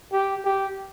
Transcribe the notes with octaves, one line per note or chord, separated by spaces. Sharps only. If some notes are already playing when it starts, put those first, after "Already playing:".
G4
G4